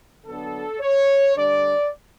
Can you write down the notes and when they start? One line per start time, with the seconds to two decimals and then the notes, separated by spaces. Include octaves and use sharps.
0.25 D3 F#3 B3 D4 A4
0.80 C#5
1.36 D3 G3 D4 D5